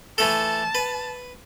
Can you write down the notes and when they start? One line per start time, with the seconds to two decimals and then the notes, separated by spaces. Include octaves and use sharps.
0.18 E3 A3 A4 A5
0.75 B4